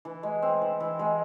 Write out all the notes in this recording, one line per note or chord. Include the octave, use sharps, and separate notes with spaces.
E3
G#3
C4
E3
E3
G#3